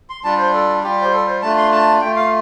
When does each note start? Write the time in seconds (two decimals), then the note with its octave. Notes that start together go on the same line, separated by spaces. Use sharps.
0.10 C6
0.24 G3 D4 F4 A5
0.38 C5
0.53 A4
0.83 G3 F4 G4
1.01 C5
1.13 A4
1.27 C5
1.42 A3 D4 F4 A5
1.57 C6
1.72 A5
2.01 A3 F4 G5
2.16 F5